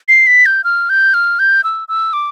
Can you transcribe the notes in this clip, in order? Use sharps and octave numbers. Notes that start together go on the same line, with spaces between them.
C7
B6
G6
F6
G6
F6
G6
E6
E6
D6